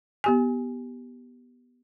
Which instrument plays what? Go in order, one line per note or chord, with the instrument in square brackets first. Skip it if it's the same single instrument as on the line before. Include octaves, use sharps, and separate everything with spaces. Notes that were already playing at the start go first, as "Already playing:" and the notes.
[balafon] B3 G4 G#5